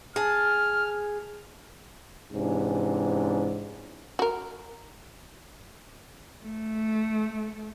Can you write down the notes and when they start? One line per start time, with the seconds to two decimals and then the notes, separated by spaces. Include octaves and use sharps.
0.16 G#4 A5 F6
2.33 G#2 C3 E3 C#4 D4
4.19 F#4 A#4
6.45 A3